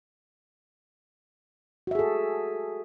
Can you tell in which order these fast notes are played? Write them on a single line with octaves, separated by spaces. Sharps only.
F#4 E5 G#4 A4